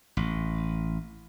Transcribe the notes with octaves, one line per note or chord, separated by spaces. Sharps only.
A1